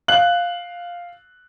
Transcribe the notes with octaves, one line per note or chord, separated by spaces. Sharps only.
F5 F#6 F#7